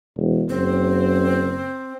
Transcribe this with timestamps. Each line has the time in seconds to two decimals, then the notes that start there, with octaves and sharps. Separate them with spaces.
0.16 E1
0.49 F#1 C4